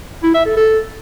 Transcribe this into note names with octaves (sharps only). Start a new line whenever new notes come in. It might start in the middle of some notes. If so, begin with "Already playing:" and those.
E4
E5
A4
A4